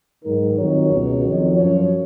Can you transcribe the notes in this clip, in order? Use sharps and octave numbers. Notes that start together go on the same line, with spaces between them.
G#2 D#3 F#3 A#4
F2 D#3 F#3 C#5
C#2 B2 F#3
F2 D#3 F#3
F#2 F3 C#5